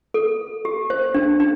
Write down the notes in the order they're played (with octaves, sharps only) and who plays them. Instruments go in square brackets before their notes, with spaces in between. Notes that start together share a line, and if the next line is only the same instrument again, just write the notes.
[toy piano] A4
G4
C5
D4
D4